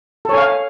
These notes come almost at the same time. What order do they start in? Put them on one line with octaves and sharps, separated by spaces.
A4 C#5 G#5 F5